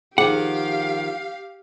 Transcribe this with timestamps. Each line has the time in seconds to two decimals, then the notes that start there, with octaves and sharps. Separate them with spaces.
0.18 D#3 F3 G4 G#4 F5 F#5